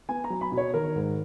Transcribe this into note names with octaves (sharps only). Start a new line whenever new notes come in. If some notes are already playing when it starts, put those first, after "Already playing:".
B3 G#5
A#5
F#3
B5
B2
C#5
D#3 A#4
G#2